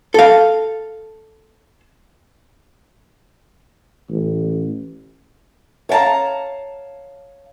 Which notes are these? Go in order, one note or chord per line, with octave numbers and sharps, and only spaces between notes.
A4 F5
A1
C#5 F5 G5 A5 A#5